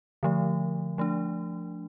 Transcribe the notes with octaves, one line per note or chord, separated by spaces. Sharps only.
D3 F3 A3
F3 A3 D4